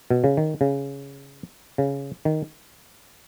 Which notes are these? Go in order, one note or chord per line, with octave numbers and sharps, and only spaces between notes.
B2
C#3
D#3
C#3
C#3
D#3